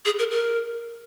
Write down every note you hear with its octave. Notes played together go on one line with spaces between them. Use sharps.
G#4
A#4
A#4